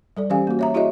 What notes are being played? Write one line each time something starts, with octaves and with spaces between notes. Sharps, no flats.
G3 A4 D5
E3 G3 C#4 G4 F5 G#5
A#3 F#4
C#5 E5 A#5
E4 F#4 G#4 C#5 D#5 E5